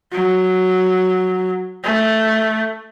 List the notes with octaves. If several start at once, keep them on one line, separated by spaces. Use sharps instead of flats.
F#3
A3